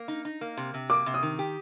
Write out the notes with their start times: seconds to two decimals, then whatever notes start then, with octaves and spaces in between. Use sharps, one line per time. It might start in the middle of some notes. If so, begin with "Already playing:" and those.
Already playing: A#3
0.08 D#4
0.25 D#4
0.41 A#3
0.57 C3
0.74 C3
0.90 A#3 D6
1.06 C3
1.14 D#6
1.23 D#3
1.39 G4